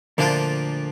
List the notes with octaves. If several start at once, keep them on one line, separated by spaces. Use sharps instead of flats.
D2 A#2 D3 F3 D4 F4